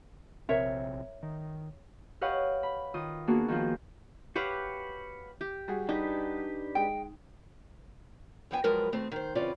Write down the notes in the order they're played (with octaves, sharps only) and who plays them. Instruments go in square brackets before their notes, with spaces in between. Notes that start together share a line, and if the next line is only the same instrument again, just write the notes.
[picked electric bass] A#1 C3 C4 [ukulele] A#4 C#5 E5
[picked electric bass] D#3
[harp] G4 B4 C#5 D#5 F5 F#5
B5
D#3 F4 D#6
A#3 B3 D4 F#4 G#4
D#3 F3 F4
[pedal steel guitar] F#4 B4 F5 [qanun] G4 C#5 F#5
[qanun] G4
[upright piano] G3 F#4 G#4
[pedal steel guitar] D4 G4 B4 [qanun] D#4
[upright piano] G#3 [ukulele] G5
[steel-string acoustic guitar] E3 F3 B3 G5 G#5
F#2 F3 G#3 A#4 B4
B2 D#3 A3 C4
D#3 C5
C#3 E3 C4 C#4 F4 D5